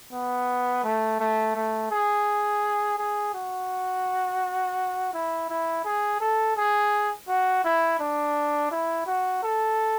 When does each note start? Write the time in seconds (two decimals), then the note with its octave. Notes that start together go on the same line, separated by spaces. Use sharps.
0.13 B3
0.84 A3
1.20 A3
1.55 A3
1.91 G#4
2.98 G#4
3.34 F#4
5.14 E4
5.50 E4
5.85 G#4
6.20 A4
6.57 G#4
7.28 F#4
7.65 E4
7.99 D4
8.71 E4
9.07 F#4
9.43 A4